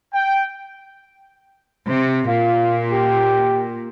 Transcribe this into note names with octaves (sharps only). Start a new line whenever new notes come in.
G5
C3
A#2 F4
G4